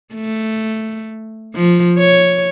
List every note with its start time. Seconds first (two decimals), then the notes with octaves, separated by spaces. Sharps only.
0.15 A3
1.55 F3
1.99 C#5